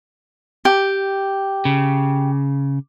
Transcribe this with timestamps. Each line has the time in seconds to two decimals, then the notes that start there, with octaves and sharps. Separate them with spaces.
0.65 G4
1.65 C#3